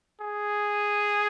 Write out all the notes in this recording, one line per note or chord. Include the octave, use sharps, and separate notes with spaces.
G#4